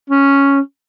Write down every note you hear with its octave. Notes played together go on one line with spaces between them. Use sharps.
C#4